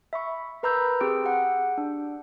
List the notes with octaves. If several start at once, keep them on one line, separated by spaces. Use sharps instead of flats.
E5 B5 C#6
A#4 B4 A#5 B5 E6 G6
C4 G4 G#4 C6 E6 D7
G4 F#5
D4